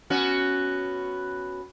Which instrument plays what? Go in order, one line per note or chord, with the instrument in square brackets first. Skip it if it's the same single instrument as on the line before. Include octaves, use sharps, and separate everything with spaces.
[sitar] B3 C#4 F#4